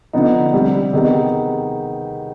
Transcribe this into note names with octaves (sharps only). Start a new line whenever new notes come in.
D3 F3 B3 D#4
C3 G3 C4
C3 D#3 B3 D#4 G#4